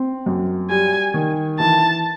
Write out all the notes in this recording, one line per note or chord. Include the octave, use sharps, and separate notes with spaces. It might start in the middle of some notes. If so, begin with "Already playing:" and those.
Already playing: C4
F#2
G3 G#5
D#3
E3 A5